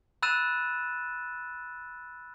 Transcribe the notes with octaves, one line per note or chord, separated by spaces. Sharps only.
B5 E6 F#6 A6 D#7 E7